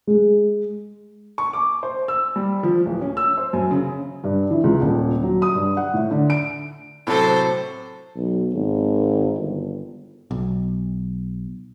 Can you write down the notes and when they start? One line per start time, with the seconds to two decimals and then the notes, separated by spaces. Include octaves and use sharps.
0.07 G#3
1.38 C#6
1.53 D6
1.83 C5
2.08 E6
2.36 G3
2.63 F3
2.86 D1
3.01 C#4
3.17 E6
3.37 C5
3.53 F#2
3.71 C#3
4.24 G2
4.51 E3
4.64 C#2
4.82 D#1
5.23 F#3
5.42 D#6
5.55 G2
5.77 F#5
5.94 A2
6.11 D3
6.30 D7
7.07 A2 C3 F#3 A4 C5
8.16 B1
8.53 G#1
9.37 G1
10.31 B1